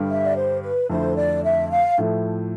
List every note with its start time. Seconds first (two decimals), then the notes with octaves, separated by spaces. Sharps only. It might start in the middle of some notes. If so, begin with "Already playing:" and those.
Already playing: G2 D3 G3
0.08 E5
0.24 D5
0.35 C5
0.62 B4
0.89 F2 D3 A3 E4 C5
1.16 D5
1.43 E5
1.70 F5
1.98 A2 F3 A3